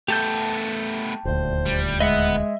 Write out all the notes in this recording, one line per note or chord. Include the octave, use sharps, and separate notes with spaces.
A3 B3 G4 A5 G6
D#1 D2 C5
G3
G#3 B4 D#5 E5 F#5